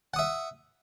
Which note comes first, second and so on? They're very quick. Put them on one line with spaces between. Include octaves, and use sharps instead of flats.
F#5 D#6 E5